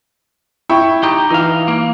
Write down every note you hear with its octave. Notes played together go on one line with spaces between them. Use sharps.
E4 G5 C#6
D#4 G4
E3 D#4 F5
A#3